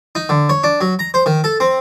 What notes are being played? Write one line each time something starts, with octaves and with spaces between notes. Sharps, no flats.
D#4
D3
C#5
D4
F#3
A#5
C5
D#3
A4
C4